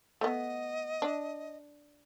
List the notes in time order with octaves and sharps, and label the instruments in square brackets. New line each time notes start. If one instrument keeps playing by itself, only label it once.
[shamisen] A3 B3 [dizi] D#5
[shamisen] D4